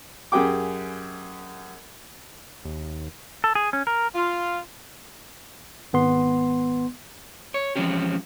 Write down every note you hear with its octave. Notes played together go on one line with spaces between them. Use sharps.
F#2 G4 G#4 G5 D6
D#2
A4
G#4
C#4
A#4
F4
G#1 B3 C6
C#5
E3 F3 G#3 C4 C#4 G4